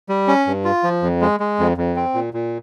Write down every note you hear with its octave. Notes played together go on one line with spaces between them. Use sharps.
G3
C#4
G2
F4
F3
F2
G#3
G#3
F2
F2
C4
A#2
A#2